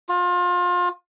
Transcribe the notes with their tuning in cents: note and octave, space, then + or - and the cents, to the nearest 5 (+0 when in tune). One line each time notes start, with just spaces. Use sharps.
F4 +30